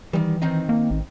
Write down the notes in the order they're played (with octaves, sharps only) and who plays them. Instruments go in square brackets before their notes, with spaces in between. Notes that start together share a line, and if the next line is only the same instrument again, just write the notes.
[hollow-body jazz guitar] D#3 G3 [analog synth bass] E3
[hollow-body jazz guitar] D#3 C4 D#4
[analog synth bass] A#3
A1